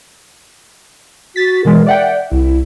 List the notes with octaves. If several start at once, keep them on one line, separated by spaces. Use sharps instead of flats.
F#4 A6 B6
B2 E3 G#3 A#4
D5 E5 F#5 G5
C2 E4